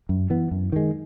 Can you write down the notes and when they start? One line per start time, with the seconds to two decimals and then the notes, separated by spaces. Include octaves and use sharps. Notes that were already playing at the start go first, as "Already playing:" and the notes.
0.09 F#2
0.30 E3 B3
0.51 F#2
0.72 D#3 G#3